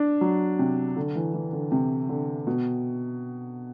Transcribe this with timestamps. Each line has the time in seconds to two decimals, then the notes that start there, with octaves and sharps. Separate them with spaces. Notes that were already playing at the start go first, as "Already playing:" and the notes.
Already playing: D4
0.21 F#3
0.59 C3
0.96 D3
1.15 E3
1.34 E3
1.53 D3
1.72 C3
2.09 D3
2.47 B2